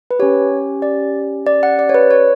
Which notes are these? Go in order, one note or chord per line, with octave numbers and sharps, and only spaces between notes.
B4
C#4 G4 C#5
D5
D5
F#5
D5
C#5
B4
C#5